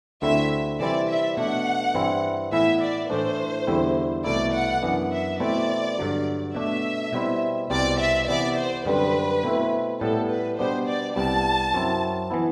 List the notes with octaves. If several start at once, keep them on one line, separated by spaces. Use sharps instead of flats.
D2 D3 A3 C4 E4 E5
C3 E3 G3 C4 E4 D5
E5
B2 A3 D4 F#5
G2 E3 G3 C4 E4
A2 E3 B3 E4 E5
D5
A2 E3 A3 D4 C5
E2 D3 G3 C4 E4
C2 B2 A3 E4 D5
F#5
F#2 E3 B3 D4
E5
B2 A3 C4 E4 D5
G2 D3 F#3
B2 A3 D4 E5
B2 G3 C4 E4
C2 B2 G3 C4 D5
E5
C3 E3 B3 D5
C5
F#2 D3 G3 C4 B4
B2 A3 C4 E4
A2 G3 B3 A4
B4
B2 G3 B3 D4 C5
D5
C2 C3 G3 B3 A5
F#2 F#3 C4 E4
E3 B3 E4